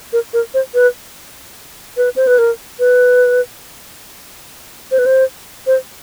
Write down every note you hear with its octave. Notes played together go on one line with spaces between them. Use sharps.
A#4
A#4
C5
B4
B4
C5
B4
A#4
B4
C5
B4
C5
C5